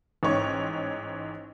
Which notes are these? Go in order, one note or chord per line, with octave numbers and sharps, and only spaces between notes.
A1 G#2 C#4 C#5 C#6